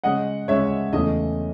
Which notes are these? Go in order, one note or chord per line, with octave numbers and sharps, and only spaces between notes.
C#3 G#3 C#4 D#5 F#5
C#3 G#3 C#4 C#5 E5
E2 C#3 E3 A3 C#4 D#5